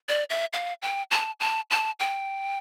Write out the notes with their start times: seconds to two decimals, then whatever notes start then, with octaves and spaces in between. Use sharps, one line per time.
0.09 D5
0.30 E5
0.53 F5
0.82 G5
1.11 A5
1.40 A5
1.71 A5
2.00 G5